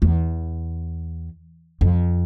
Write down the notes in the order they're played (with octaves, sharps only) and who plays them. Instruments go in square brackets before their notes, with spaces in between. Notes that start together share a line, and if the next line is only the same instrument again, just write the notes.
[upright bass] E2
F2